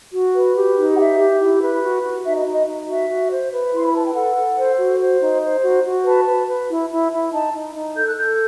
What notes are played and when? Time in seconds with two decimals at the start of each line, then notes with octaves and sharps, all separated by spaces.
0.12 F#4
0.33 B4
0.55 G4
0.76 D#4
0.93 F#5
0.97 G4 E5
1.18 G4
1.40 E4
1.61 B4
1.82 F#4
2.03 F#4
2.24 D#4 E5
2.33 D#5
2.45 D#4 D#5
2.66 D#4
2.87 F#4 E5
3.09 F#4
3.30 C5
3.51 B4
3.72 E4 C6
3.87 B5
3.94 B4 A5
4.05 G5
4.14 A4 F#5
4.35 A4
4.57 C5
4.79 F#4
4.99 C5
5.21 D#4
5.42 C5
5.63 F#4
5.84 F#4
6.05 B4 A5
6.26 B4
6.48 B4
6.69 E4
6.90 E4
7.11 E4
7.32 D#4 A5
7.53 D#4
7.75 D#4
7.96 A4 G6
8.06 F#6
8.16 A4 G6